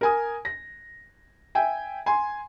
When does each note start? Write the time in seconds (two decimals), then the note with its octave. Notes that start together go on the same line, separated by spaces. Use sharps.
0.01 A#4 G#5 D#6
0.45 A#6
1.55 E5 G5 G#5
2.06 G#5 C6